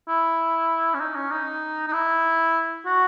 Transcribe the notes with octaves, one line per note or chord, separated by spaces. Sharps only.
E4
C#4
D#4
C#4
D#4
D#4
E4
F#4